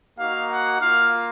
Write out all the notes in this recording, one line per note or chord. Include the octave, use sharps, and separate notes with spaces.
A#3 D#4 F#4 F5
F#5
A#3 F4 F5